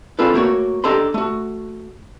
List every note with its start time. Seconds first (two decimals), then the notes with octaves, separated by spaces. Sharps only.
0.19 C4 D4 F4 G#4 A4 B4
0.34 A3 A#3 F#4 C#5
0.84 D4 G4 A4 D#5 A#5 C6
1.14 A3 F#4